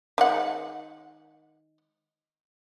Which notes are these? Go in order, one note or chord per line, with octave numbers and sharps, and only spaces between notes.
D#3 G#3 F#5